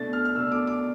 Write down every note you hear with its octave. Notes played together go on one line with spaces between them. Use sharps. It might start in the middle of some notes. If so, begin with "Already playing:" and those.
Already playing: B2 A3 D4 A6
F6
F6
B2 A3 D4 E6
D6
D6